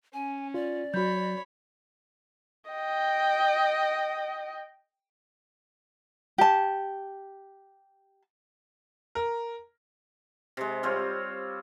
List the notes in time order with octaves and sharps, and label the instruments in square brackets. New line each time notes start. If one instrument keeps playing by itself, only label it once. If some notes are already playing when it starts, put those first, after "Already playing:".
[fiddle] C#4 [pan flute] G#5
[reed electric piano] F4 [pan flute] D5
[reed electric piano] F#3 [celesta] F#4 G6 [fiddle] C#5 B5
[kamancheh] D#5 G5
[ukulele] G4 A5
[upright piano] A#4
[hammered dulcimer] C3 G#3
G3 C4 F4 C#5